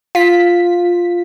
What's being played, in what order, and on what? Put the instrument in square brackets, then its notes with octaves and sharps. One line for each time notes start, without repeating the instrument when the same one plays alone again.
[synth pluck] F4 B6